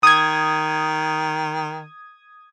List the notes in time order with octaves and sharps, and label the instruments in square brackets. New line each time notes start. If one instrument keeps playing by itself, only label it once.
[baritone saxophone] D#3 [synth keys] D#6 G#6